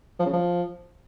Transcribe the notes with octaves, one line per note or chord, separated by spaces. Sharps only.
F3
C#3
F3